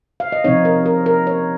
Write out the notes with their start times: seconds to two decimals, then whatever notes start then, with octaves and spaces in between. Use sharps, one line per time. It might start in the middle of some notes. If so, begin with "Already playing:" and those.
0.20 F5
0.32 D#5
0.44 C3 F3 C4 D#4 C#5
0.65 A#4
0.86 A#4
1.06 A#4
1.27 C#5